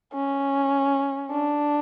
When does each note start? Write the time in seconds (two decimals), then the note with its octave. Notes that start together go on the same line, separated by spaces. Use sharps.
0.14 C#4
1.31 D4